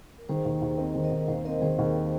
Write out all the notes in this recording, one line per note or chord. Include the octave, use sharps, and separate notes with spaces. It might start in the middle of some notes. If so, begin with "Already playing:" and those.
A#4
D#3 G#4 C5
D#2
D#2
C4 A#4 D#5
D#3
A#4 D#5
D#2
D#2 C5 F5
C4 A#4 D#5
D#3 G#4 C5
D#2